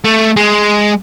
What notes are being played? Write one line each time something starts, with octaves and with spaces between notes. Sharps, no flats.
A3
G#3